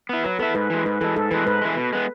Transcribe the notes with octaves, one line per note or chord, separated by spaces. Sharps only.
B3 E4
F#3 B4
B3 E4 A4
G#2 B4
E3 G#3
G#2 B4
E3 G#3 A4
G#2 A4
E3 G#3 B4
G#2 B4
E3 G#3
B2
G#3 B3